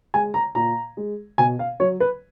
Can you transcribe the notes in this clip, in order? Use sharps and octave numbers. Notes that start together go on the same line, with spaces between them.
G#3 G#5
A#5
A#2 A#5
G#3
B2 G#5
F5
F#3 C#5
B4